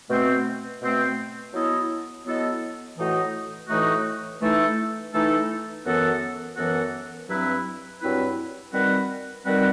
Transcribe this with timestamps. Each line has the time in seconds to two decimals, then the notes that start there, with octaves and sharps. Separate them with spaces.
0.09 B2 A3 C4
0.81 B2 A3 C4
1.52 F#3 B3 E4 A4 D#5
2.24 F#3 B3 E4 A4 D#5
2.96 A2 E3 A3 D#4 F#4
3.68 A2 E3 A3 D#4 F#4
4.40 E3 A3 D#4 A4
5.12 E3 A3 D#4 A4
5.85 F#2 E3 B3 F#4 A4
6.56 F#2 E3 B3 F#4 A4
7.28 G2 F#3 C4 E4 B4
8.00 G2 F#3 C4 E4 B4
8.72 D#3 G3 C4 F#4 B4
9.44 D#3 G3 C4 F#4 B4